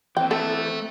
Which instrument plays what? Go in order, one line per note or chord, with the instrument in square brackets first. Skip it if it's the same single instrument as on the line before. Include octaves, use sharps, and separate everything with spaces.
[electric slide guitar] E3 C4 [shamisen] G5
[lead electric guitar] A3 E5 [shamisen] A4